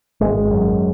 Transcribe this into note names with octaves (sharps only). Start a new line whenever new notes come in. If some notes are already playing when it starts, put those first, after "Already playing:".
G#1 G#3
F#2